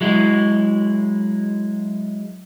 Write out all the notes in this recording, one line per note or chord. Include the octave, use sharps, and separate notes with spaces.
F#3 G#3 E4